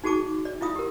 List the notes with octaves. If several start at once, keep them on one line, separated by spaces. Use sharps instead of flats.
D#4 F#4 G#4 A5 D6
D5
E4 F4 F5 D#6
G4 A#4